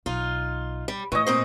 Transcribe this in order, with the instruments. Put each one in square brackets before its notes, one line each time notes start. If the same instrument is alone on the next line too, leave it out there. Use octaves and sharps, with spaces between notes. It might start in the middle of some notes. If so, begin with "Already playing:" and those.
[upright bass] B1 [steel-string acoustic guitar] D#4 F4
[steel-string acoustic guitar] G3
[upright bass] A2 [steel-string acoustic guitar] E3 [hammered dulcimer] D#5 C#6
[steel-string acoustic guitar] A#2 C4 C5